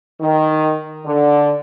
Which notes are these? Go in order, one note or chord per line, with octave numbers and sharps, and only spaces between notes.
D#3
D3